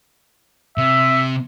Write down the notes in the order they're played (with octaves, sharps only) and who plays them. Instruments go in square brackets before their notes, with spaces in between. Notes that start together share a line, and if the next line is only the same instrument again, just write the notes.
[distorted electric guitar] C3 [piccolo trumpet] E5